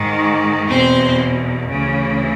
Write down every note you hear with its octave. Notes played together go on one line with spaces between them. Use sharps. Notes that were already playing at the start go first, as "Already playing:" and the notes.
Already playing: G#2 D#3
E2 B2 C4 C5
D2 C#3 E3